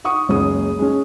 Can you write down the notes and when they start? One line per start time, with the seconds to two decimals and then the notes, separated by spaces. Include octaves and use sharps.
0.05 F#5 C#6 D#6
0.29 F#1 C#2 G#3 C#4 D#6
0.79 G#3 C#4